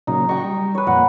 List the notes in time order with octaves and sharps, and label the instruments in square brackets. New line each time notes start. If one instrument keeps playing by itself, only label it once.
[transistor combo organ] A#2 C#3 F#3 [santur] D#4
[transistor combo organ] F#4 C#6 [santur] D#5 G5 D#6
[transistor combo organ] G3
[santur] B4 C#5
[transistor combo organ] F2 A#2 [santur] F#5